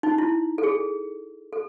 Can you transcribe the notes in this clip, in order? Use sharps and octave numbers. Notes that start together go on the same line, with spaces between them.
D#4
E4
A4
G#4
A4